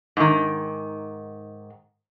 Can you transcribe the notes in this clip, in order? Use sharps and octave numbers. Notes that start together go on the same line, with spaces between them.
G#2 D#3